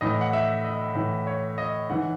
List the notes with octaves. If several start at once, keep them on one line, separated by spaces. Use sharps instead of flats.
A2 E3 D#5
F#5
E5
D#5
A2 E3
C#5
D#5
G#2 E3 F#5